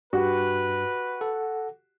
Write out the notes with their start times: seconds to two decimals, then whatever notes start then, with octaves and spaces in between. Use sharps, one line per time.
0.13 G2 F#4 G4 B4
1.21 A4 F#5